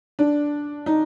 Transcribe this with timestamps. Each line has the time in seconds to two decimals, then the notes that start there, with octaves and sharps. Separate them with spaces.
0.19 D4
0.86 D#4